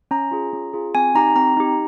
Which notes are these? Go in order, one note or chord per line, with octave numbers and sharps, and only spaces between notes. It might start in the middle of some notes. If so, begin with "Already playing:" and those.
C#4 A#5
F4 G#4
C#4
F4 G#4
C4 G#5
D#4 G4 A#5
C4 A#5
D#4 G4